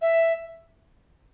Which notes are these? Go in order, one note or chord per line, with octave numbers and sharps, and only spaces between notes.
E5